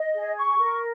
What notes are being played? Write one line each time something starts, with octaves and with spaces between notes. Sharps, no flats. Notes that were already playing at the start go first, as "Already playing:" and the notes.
Already playing: D#5
G#4
C#6
A#4